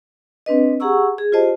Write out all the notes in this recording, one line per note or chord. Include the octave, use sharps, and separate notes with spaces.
C4 D4 B4 D#5
G4 G#4 F#5 A#5 C#6 E6
G#4
F4 G4 C5 D#5 A5